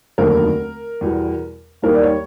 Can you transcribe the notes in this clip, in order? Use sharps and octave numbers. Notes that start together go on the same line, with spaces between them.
F1 D#2 D3 F#3 A#4
E2 B2 G3
D#2 D#3 G3 A#3 A#4
D5
C#5